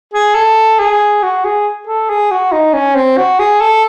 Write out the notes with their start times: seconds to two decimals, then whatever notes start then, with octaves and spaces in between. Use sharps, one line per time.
0.13 G#4
0.35 A4
0.79 G#4
1.23 F#4
1.44 G#4
1.87 A4
2.09 G#4
2.31 F#4
2.52 D#4
2.73 C#4
2.95 C4
3.17 F#4
3.39 G#4
3.61 A4